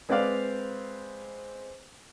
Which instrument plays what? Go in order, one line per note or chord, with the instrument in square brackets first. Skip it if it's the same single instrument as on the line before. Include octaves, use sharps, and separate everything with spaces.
[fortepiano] G#3 C4 B4 C5 D5 F5